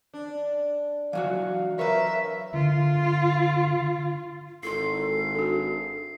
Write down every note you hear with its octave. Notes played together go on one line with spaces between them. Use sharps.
D4
E3 F#3 F#4 F5
A#4 B4 C#5 E5
D3 F4
G#1 E4 A4 C6 C7
D4 F#4